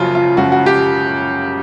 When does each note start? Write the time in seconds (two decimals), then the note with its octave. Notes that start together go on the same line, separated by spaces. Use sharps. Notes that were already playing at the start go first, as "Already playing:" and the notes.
Already playing: F#1 F#2 C#3 F3 F4
0.15 F4
0.37 F#1 F#2 C#3 F3 F#4
0.52 F#4
0.66 G4